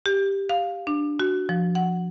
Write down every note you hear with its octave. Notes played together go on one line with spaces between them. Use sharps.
G4
F5
D4
F#4
F3
F#5